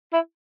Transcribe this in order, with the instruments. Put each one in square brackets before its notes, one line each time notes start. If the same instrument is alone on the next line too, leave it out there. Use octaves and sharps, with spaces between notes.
[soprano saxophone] E4